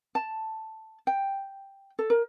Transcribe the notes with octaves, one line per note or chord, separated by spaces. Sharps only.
A5
G5
A4
A#4